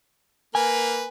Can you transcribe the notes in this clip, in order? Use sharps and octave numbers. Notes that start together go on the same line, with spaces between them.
A#3 A#4 B4 G#5